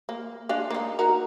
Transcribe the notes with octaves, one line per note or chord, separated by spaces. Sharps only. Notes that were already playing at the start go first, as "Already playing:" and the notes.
A#3
G#3 D4 F5
A#3 D#4
D#4 F#4 A#4